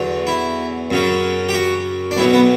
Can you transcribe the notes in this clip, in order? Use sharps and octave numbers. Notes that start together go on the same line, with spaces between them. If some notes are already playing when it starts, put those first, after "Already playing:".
Already playing: E2 D3 F#3
E4
F#2 C#3 F#3
G4
F#4
D4
B1 B2 F#3 E4
B3